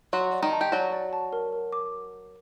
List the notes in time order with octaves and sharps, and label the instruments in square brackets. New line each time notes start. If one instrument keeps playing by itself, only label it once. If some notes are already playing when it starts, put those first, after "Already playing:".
[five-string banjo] F#3 F#4 [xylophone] C6
[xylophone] D5
[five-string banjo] D#3 D#4
[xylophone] A5
[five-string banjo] G4
[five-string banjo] F#3 F#4 [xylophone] D5
[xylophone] D5
A5
A#4
A#4
D6